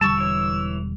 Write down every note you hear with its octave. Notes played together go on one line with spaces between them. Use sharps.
E1 D3 G3 A5 C#6 E6
E3 C#5